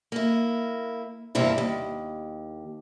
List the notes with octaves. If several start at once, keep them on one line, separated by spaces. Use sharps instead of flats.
A#3 E4
E2 G2 C3 A#3 C4 E4
D#2